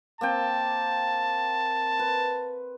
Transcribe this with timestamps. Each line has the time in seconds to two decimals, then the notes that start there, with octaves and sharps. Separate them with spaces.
0.21 A#3 C4 G5 A5
1.99 B4